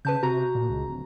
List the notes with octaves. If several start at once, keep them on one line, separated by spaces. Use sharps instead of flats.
C#3 B4 A5 G6
C3 F#4 A#5
A#2
C#2
D1